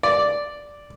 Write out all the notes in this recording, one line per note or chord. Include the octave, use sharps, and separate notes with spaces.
D5